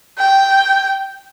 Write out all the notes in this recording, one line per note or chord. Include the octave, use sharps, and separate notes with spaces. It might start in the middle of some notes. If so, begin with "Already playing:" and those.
G5